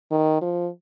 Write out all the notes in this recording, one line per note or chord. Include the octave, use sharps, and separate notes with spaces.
D#3
F3